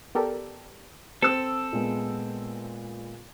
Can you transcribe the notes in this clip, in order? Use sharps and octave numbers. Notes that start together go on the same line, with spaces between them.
B3 G4 A4 A#4 D5
C4 A4 E6
A#2 G#3 B3